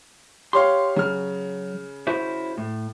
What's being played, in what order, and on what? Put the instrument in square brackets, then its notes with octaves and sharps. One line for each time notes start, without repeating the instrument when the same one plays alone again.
[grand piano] G4 C#5 F5 [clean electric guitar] C6
[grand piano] C#3 F6 [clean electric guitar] F#3
[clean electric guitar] E4 F#4 C5
A2